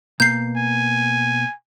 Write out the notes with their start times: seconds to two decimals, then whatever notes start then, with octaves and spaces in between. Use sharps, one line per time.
0.20 B2 A#3 A#5 G6 C7
0.56 G#5